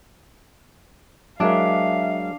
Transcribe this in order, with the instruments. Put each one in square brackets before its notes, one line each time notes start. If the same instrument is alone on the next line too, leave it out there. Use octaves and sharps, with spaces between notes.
[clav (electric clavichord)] F#3 G#3 A#4 [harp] D4 [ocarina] E5 [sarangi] F5